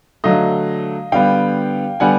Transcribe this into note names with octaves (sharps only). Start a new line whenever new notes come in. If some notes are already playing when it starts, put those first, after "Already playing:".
D3 F#3 A3 D#5 F5
D3 G3 B3 F5 G5
D3 G3 B3 F#5 G#5